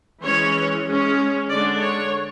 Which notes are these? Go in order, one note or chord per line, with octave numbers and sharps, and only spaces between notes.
E3 G#3 C#4 C#5
G#3 C#4
D3 G#3 D4 D5
C#5